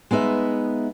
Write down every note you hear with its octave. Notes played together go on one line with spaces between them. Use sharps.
G#3 B3 D#4 E5